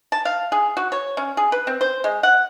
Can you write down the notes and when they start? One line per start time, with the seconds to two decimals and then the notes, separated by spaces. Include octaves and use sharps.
0.12 A5
0.25 F5
0.52 G#4
0.77 F#4
0.92 C#5
1.17 C#4
1.37 G#4
1.52 B4
1.67 C4
1.81 C5
2.04 G#3
2.23 F#5